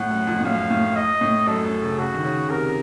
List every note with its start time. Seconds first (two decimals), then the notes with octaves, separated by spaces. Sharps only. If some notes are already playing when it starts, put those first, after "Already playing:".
Already playing: A2 F#5
0.11 F#2
0.27 F2
0.41 A2
0.45 F#2 F5
0.70 A2
0.96 D#5
1.21 A2
1.47 F#2 A4
1.65 F#2
1.82 C#3
1.98 C#3 F#4
2.14 D#3
2.24 C#3
2.50 C3 A#4